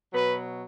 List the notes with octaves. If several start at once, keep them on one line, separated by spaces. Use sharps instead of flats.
B2 F#3 B4